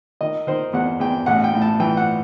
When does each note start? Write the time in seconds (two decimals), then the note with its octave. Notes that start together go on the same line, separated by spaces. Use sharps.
0.21 D#3 D#5
0.47 D#3 C5
0.73 E2 F#5
1.00 E2 G5
1.26 A1 F#5
1.44 G5
1.53 A2
1.62 A5
1.80 E3 G5
1.97 F#5